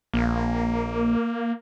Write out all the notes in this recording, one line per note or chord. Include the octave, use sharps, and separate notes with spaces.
A#1 A#3